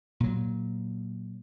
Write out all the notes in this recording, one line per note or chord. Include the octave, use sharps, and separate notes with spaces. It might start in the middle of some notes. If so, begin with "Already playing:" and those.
A#2 F#3